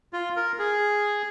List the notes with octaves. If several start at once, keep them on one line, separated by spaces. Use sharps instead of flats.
F4
A#4
G#4